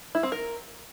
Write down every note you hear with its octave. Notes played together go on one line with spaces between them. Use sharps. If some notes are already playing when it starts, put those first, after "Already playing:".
E4
C4
A#4